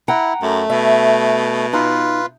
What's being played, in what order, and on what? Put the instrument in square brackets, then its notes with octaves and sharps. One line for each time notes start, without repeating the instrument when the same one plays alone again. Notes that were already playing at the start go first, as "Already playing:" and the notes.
[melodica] E4 [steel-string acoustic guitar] F#5 G5 A#5
[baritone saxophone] F#2 [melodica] A3
[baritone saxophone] B2 [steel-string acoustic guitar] E5
[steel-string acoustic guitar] D#4 [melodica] F4 B4